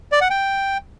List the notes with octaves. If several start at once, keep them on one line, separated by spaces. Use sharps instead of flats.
D5
F#5
G5